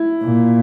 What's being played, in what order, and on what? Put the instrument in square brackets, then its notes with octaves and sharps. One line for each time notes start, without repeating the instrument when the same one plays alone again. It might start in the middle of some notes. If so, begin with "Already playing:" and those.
Already playing: [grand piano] E4
[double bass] A#2